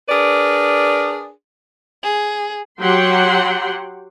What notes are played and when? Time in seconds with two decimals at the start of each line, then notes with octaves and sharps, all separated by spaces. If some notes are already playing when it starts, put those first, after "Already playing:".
0.08 D4 G#4 A#4 B4 D5
2.03 G#4
2.79 F#3 G4 F#5 G5 C6